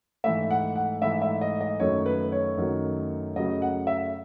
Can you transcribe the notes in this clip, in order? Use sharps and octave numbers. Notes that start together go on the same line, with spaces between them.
G#2 E3 A3 E5
F#5
F#5
G#2 E3 A3 E5
E5
D#5
D#5
F#2 D#3 F#3 A3 C#5
B4
C#5
F#2 D#3 F#3 A3
F#2 C#3 F#3 A3 D#5
F#5
E5